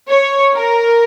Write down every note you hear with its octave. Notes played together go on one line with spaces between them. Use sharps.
C#5
A#4